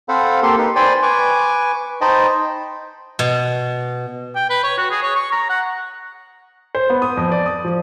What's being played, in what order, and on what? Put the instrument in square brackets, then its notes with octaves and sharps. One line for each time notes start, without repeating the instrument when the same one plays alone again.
[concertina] C4 A4 C5 F5 F#5 B5
A#3 G4 A4 C6
D#4 G4 B4
C5 D5 G5 G#5 B5 C6
B4 G#5 C#6 D6
D#4 C5 D#5 G5 A5 B5
[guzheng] B2
[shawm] G5
B4
C#5
F#4
G#4
C#5
C#6
A#5
F#5
[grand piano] C5
B3
D#6
F2
D5
D#6
F3